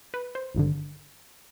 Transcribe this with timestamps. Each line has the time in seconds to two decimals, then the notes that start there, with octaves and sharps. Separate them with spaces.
0.14 B4
0.35 C5
0.55 G#1 G2 D3